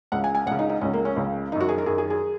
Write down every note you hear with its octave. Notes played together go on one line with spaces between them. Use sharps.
C#2 C#3 F#5
G#5
G#5
C#2 F#5
C#3
D#4
D#4
C#2 C#3 C#4
A#3
C#4
C#2 C#3
F#2 D#3 D#4
F#4
G#4
A#4
F#2 D#3 G#4
G#4
G#4